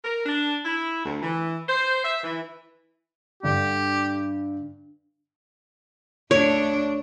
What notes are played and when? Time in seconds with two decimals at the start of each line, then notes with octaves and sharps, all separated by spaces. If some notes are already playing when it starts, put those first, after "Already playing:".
0.05 A#4
0.26 D4
0.65 E4
1.06 D2
1.23 E3
1.68 C5
2.05 E5
2.24 E3
3.43 G2 D3 G4
6.31 D2 D4 C#5